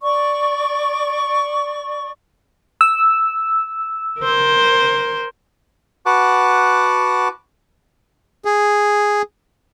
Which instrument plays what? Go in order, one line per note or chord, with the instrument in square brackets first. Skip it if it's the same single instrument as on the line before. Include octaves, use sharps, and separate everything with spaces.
[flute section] D5 C#6
[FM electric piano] E6
[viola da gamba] A#4 C5
[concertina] F#4 B4 F#5 A5 D6
[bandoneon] G#4